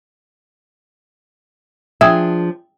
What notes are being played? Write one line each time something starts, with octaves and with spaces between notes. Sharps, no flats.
F3 D4 G#4 E5 G5 D#6 G#6